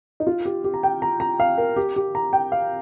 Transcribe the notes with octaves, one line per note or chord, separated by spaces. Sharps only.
D#4
F4
G4
G4
A#5
G5
A#5
A#5
F5
A#4
G4
G4
A#5
G5
F5